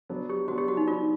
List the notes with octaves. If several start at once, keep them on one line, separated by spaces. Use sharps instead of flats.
F#3 B3 D4
G4
F#3 B3 D4 F#4
G4
F#4
D#4
F#3 B3 D4 F4